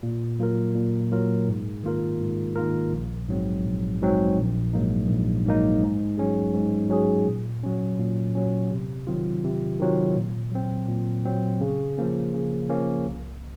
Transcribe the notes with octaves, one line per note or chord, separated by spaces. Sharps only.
A#2
F#3 A#3 F4 A#4
A#2
F#3 A#3 F4 A#4
G#2
D#3 A#3 F4 A#4
G#2
D#3 A#3 F4 A#4
A#1
G#2 F#3 C4
A#1
G#2 F#3 C4
A#1
G#2 F#3 A#3 D#4
A#1
G#2 F#3 A#3 D#4
G#2
F#3 C#4 G#4
G#2
F#3 C#4 G#4
A#2
F#3 C#4
A#2
F#3 C#4
C3
D#3 F#3 C4 F4
C3
D#3 F#3 C4 F4
A#2
F#3 C4
A#2
F#3 C4
C#3
F3 A#3 C#4
C#3
F3 A#3 C#4
C2